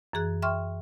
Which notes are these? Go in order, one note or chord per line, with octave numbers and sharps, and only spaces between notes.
F#2 E3 G#4 F#6
E5 G5 C6 C#6 F6